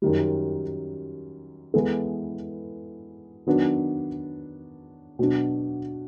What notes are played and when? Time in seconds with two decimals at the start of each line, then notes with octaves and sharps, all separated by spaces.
0.02 F#2 D#3 G3
1.74 E3 G#3 B3 E4 A4
3.47 D#3 F#3 B3 D4
5.19 B2 F#3 B3 D4